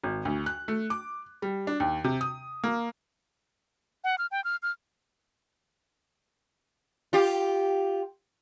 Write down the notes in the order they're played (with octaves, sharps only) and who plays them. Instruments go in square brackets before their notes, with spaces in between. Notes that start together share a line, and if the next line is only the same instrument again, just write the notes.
[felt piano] G#1
D2
F#6
A3
D6
G3
D4
D#2
C3
D#6
A#3
[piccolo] F#5
F6
G5
F6
F6
[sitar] F4 G4